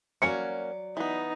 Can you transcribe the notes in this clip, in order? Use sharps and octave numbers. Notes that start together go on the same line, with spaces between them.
F#3 A#3 C#4 F#4 D5 C#7
E3 B3 D#4